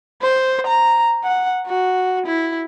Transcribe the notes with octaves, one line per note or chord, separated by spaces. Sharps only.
C5
A#5
F#5
F#4
E4